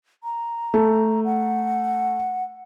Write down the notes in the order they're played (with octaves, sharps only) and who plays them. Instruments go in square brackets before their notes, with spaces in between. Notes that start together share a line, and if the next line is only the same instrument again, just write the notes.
[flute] A#5
[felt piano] A3
[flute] F#5